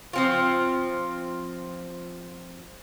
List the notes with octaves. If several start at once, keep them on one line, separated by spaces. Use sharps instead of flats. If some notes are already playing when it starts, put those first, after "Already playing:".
F3 C4 F4